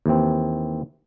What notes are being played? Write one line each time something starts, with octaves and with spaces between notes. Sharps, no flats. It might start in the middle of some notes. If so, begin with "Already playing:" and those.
D#2 E3 C4